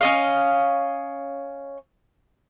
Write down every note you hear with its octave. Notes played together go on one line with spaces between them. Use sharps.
C#4 D#5 F5